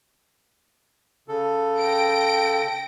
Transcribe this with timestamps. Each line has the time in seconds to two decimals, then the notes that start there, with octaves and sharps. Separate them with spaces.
1.28 C#3 A4
1.79 G5 A#6 D7